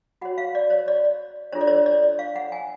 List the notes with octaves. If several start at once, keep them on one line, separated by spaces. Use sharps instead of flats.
F#4 C#5 F#5
F5
D5
C#5
D5
D4 F4 A4 C#5
D5
C#5
D5
F5
F#5
G#5